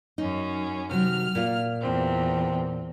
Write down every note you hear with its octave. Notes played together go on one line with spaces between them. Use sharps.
F#2 C#4 D#4
C3 D#3 F#3 F6
A#2 F4 F5
E2 C4